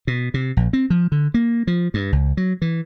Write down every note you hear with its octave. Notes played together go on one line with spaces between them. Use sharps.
B2
C3
A#1
C4
F3
D3
A#3
F3
G2
C#2
F#3
E3